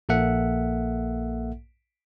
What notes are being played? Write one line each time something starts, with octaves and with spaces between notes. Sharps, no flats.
A#1 A#3 A4 E5 F#5